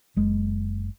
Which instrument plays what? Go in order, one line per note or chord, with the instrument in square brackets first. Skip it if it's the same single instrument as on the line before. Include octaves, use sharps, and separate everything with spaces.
[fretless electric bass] F#1 G#3